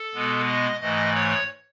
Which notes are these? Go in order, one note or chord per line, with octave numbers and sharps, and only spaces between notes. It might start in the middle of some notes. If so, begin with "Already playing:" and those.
Already playing: A4
B2 G#3 B3
D#5
G#2 E3 A3 D#5
C#5